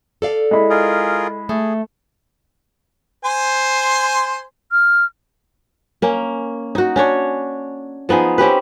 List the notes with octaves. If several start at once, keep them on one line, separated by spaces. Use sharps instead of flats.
A4 D5 F5
G#3 E4 B5
F4 G#4 A#4
A3 G#4
C5 G#5 C6
F6
A#3 C#4
D#4 F#4
C#4 D4 C#5
F3 B3 D#4 G#4
C4 C#4 G4 B4